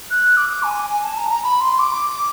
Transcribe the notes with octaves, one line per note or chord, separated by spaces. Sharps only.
F#6
D6
G#5
G#5
A5
A#5
A#5
B5
C6
D6